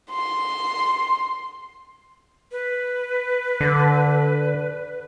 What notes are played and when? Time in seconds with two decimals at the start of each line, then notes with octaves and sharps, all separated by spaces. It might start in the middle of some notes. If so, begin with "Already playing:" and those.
0.11 C6
2.52 B4
3.60 D3